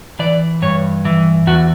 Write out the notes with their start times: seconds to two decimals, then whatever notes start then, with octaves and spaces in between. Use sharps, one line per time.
0.19 E3 D5
0.62 G2 C#5
1.05 E3
1.47 E2 F#4